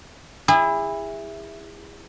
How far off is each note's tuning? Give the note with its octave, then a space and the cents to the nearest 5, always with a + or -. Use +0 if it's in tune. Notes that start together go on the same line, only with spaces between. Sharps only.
E4 +0 G#4 -35